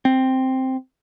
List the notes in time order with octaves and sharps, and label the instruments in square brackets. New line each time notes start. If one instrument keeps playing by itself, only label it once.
[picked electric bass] C4